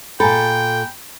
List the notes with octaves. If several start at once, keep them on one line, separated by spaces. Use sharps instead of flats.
A#2 A4 G5 G#5 A#5 B5